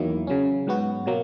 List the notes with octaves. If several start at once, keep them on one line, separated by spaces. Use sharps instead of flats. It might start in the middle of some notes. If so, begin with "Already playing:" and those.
Already playing: E2 D#3 F#3 A#3 E4
C#3 F#3 C#4
G#2 F#3 B3 F#4
B2 F#3 A#3